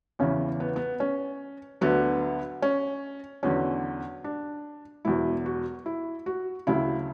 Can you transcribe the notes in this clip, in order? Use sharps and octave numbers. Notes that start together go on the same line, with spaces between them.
E2 C#3 E3 C#4
B3
B3
C#4
D2 D3 F#3 B3
C#4
E2 D3 F#3 C#4
D4
E1 E2 B2 F#3 E4
F#4
E4
F#4
D2 C#3 F#3 E4